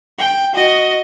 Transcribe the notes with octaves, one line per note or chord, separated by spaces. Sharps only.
G5
F#4 D#5